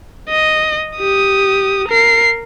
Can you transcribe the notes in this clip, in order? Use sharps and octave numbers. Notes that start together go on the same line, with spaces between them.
D#5
G4 D#6
A#4 C7